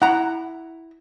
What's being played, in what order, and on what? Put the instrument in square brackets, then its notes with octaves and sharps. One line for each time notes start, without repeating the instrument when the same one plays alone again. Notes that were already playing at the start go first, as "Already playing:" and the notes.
[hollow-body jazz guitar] E4 A#5 [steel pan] F#5